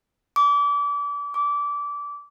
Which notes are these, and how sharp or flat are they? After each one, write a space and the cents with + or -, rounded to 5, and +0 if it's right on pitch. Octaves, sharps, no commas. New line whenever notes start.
D6 -30
D6 -20